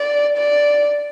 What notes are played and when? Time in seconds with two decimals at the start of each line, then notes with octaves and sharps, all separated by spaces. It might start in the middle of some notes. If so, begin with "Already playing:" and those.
Already playing: D5
0.37 D5